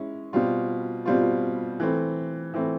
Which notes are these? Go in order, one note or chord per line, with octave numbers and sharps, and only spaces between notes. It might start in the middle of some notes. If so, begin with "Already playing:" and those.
Already playing: G#3 C#4 E4
B2 G3 C4 F4
B2 G3 C4 F4
E3 A3 C4
E3 A3 C4